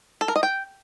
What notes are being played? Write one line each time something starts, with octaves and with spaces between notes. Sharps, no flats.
A4
A#4
D#5
G5